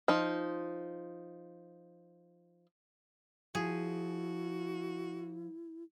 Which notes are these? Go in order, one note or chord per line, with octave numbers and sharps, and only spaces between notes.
F3 D#4
F3 E4 F#4 G#4